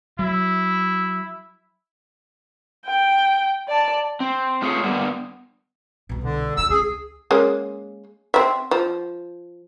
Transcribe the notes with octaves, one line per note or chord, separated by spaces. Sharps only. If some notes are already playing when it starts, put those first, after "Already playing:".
F#3 E4
G5
D5 A5
C4
A3 F4 G#4 C#5
D3 G3 A#3 B3
C2 B2
D3
D2 D3 E6
C#2 G#4
G#3 A#3 C#4
C4 E5
F3